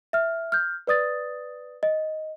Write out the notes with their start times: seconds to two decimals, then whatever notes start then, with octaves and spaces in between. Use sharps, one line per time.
0.13 E5 F6
0.52 F6 G6
0.87 B4 D5 D#6 A6
1.83 D#5